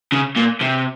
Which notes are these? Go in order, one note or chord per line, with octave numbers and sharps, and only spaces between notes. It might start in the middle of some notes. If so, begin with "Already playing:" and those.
C#3
A#2
C3